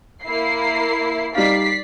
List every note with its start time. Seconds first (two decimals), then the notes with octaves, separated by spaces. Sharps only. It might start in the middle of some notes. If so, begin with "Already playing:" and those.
0.24 A#3 E4 C7
1.35 G3 D#4 D5 F5 B6 C7